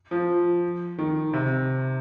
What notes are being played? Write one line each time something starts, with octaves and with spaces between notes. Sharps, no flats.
F3
D#3
C3